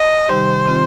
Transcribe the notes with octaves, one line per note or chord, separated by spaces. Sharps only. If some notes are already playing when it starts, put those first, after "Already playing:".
Already playing: D#5
C3 D#3 G3 D#4 G4 C5
D#3 C4 F4